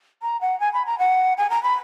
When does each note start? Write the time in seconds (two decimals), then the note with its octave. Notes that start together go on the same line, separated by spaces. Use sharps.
0.22 A#5
0.41 F#5
0.60 G#5
0.73 B5
0.86 A#5
0.99 F#5
1.38 G#5
1.50 A#5
1.63 B5